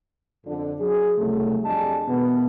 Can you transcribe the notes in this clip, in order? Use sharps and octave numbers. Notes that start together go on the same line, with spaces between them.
F2 D3
F#3 G#4
C2 C#3 F#3 A3
F2 D4 G4 G#4 D#5 A5
B2 D#3 E3 G#3 B3